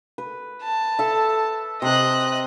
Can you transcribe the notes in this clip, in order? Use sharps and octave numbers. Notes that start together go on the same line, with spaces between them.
B4
A5
A4 E5
C3 C5 D#5 F#6